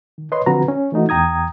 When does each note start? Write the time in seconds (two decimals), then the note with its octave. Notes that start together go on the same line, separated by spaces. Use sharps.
0.18 D#3
0.32 B4 C#5 D#5 C6
0.46 D3 F3 C4 F#4 B4 A#5
0.68 C#4
0.92 E3 A3 D#4 F#4
1.09 E2 G5 A#5 D#6 G#6